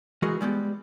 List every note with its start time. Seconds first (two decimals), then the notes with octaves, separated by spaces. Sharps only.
0.22 E3 G#3 F#4 G#4 A#4 D#5
0.41 G3 G#3 B3 G4